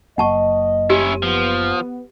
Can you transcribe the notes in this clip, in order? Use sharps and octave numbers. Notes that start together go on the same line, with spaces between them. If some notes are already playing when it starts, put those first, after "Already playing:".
F#1 F#3 A#3 D#5 F#5 A5 C#6
C#4 E4 G4
F3 B3